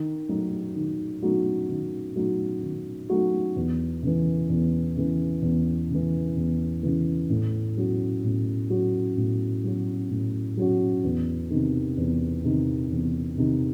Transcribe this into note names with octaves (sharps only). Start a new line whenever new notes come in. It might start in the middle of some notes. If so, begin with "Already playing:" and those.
Already playing: D#3
F#3 A3 D#4 F#4
D#3
F#3 A3 D#4 F#4
D#3
F#3 A3 D#4 F#4
D#3
F#3 A3 D#4 F#4
E2
C#3 E3
E2
C#3 E3
E2
C#3 E3
E2
C#3 E3
A2
F#3 C#4 F#4
A2
F#3 C#4 F#4
A2
F#3 C#4 F#4
A2
F#3 C#4 F#4
E2
C3 D#3
E2
C3 D#3
E2
C3 D#3